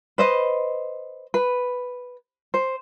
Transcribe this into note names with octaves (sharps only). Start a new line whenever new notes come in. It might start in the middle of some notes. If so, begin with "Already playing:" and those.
B4 C5 D#5
B4
C5